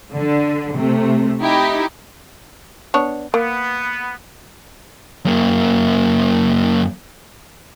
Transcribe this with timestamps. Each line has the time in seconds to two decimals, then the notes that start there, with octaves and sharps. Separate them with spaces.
0.13 D3
0.76 C3 A3
1.42 D#4 E4 G4
2.94 B3 D4 C#5
3.34 A#3 B3
5.25 F#2 A#3